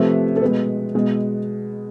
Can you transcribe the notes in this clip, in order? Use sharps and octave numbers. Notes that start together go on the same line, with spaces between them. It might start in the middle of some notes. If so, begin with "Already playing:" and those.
Already playing: C3 F3 A3 B4
A4
B2 G#3 B4
B2 G#3